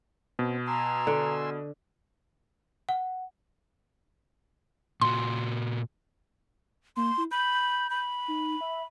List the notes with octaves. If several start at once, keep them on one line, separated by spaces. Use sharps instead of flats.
B2 C4
G#5 A#5 C6 E6
D3
F#5
A#2 F#4 C6
A#3 C6
E4
B5 G6
B5
D#4
E5